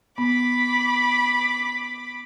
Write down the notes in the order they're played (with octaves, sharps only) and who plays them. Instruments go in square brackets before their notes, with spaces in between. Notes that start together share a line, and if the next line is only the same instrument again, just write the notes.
[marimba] B3 [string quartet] B5 D6